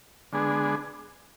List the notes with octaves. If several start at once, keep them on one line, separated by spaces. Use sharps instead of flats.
D3 G#3 B3 D4 G#4